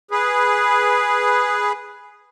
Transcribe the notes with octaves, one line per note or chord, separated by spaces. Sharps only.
G#4 B4